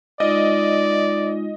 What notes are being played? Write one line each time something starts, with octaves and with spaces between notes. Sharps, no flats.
G#3 D#4 F4 D5 D#5